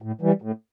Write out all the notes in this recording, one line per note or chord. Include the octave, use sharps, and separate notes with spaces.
A2
E3 G3
A2